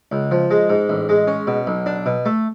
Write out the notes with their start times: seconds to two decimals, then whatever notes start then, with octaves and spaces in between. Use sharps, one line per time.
0.12 C#2
0.31 F3
0.51 G#3
0.70 G#2
0.89 A1
1.09 G#3
1.27 C#4
1.47 B2
1.67 B1
1.86 D4
2.06 B2
2.26 A3